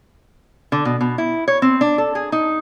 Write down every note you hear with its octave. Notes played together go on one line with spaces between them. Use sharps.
D3
B2
B2
E4
C#5
C4
D4
A4
G#4
D#4